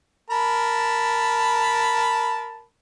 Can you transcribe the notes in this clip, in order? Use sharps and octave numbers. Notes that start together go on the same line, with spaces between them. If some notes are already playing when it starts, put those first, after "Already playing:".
A#4 A5 B5